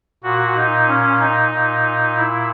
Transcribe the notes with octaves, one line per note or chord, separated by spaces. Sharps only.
A#2 F#4
D#4
C#4
D#4
A#2
E4